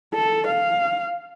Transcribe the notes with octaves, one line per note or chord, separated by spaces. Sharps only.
A4
F5